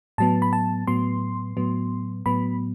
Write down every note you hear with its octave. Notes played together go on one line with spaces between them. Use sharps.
A2 F#3 B3 A5
B5
A5
A2 F#3 B3 C6
A2 F#3 B3
A2 F#3 B3 B5